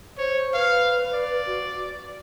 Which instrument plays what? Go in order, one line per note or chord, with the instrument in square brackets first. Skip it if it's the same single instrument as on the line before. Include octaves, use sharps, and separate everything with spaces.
[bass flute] C5 [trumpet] C#5
[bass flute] B4 [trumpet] F5
[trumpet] D5
[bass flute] F#4